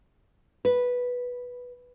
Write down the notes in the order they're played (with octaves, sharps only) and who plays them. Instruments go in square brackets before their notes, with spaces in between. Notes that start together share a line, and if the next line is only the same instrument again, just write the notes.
[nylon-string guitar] B4